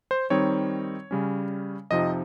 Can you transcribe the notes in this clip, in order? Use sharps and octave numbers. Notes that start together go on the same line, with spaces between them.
C5
D#3 G3 C4 D#4 C#5
C#3 G3 C#4
F2 C3 F3 C4 D#4 D#5